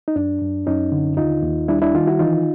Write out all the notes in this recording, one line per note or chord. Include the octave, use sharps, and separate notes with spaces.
D#4
F#2 D4
F#2
F#2 C#4 D#4
D3
D#2 D#4 F4
D#2
G3 D4 E4
D4 E4
D#3 D#4 F4
E4 F#4
E3 D#4 F4